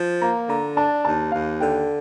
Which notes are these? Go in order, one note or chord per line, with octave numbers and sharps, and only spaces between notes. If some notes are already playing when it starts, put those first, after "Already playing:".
Already playing: F3
A#3 A#5
D3 A#5
D4 A5
D#2 A5
D#2 F5
D3 G5